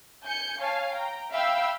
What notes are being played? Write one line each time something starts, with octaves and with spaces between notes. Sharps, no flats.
G#5 G6 C#7
C#5 F5 G#5 A5
G5 A#5
E5 F5 G5 B5 E6